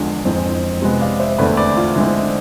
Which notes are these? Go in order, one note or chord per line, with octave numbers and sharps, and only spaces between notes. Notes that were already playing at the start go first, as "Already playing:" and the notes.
Already playing: E2 D3 F3 G#3 D4 D5 F5
F2 E3 G#3 C4
C3 G#3 B3
D5 F5
C5 E5
E2 D3 A3 C4 B4 D5
B4 D5
F4
D3 G#3 C4 E4